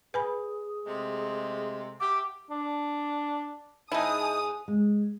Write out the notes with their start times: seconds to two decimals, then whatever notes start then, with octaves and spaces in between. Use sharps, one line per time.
0.14 G#4 B4 G#5 B5
0.85 C3 G#3 A3
2.00 G4 E5 F#5 D6
2.51 D4
3.92 G#2 D#4 E4 G#5 A5 D#6
4.68 G#3